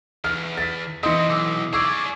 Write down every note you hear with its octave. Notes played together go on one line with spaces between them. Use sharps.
E2 F6
A6 B6
E3 C4 F#4 D#5 C6 D#6
B1 D6 E6
G#4 D5 C#6 D6 E6 G#6